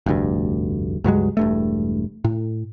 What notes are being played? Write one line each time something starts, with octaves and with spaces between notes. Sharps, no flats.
F1 D2 G2
C#2 G2 F#3 G#3
E1 G2 A3
A2